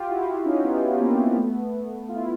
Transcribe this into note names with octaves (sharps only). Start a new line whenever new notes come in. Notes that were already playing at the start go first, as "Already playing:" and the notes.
Already playing: F4 G4
E4 F#4
C#4 D#4
B3 C#4
C#4
A#3 C4
A3 B3
F4
E4